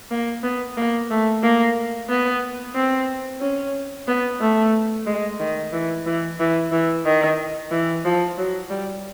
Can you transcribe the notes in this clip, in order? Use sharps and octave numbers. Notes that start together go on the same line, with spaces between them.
A#3
B3
A#3
A3
A#3
B3
C4
C#4
B3
A3
G#3
D#3
E3
E3
E3
E3
D#3
E3
F3
F#3
G3